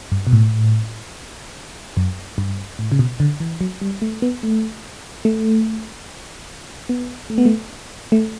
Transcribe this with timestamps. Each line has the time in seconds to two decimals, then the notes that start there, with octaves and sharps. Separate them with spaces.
0.12 G2
0.27 B2
0.33 A2
1.97 F#2
2.38 G2
2.79 A2
2.92 C#3
2.99 B2
3.20 D3
3.40 E3
3.61 F#3
3.82 G3
4.02 A3
4.22 B3
4.43 A3
5.25 A3
6.89 B3
7.30 A3
7.38 B3
7.46 A3
8.12 A3